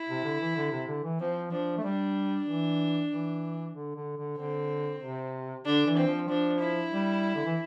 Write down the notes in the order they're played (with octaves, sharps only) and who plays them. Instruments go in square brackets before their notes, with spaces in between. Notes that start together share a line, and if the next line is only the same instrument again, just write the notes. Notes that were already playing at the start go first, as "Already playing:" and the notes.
Already playing: [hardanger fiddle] E4
[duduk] C3
D3
E3
D3
C3
D3
E3
[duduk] F3 [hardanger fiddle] C4
[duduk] F3 [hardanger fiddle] D4
[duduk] A3
[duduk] G3 [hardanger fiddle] D4
[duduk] E3
E3
D3
D3
D3
[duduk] D3 [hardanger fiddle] C4
[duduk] C3
[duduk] D3 [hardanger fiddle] D4
[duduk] E3
[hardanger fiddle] C4
[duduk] F3
[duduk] F3 [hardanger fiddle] D4
[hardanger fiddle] E4
[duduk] G3
D3
E3